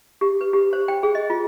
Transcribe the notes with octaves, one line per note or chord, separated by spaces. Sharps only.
G4
B4
G4
C5
G5
G#4
D#5
F4